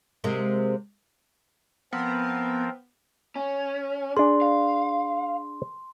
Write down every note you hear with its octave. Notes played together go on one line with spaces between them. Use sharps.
C3 G#3 A#3
F3 B3 C4 A#4
C#4
D4 G#4 C6
F5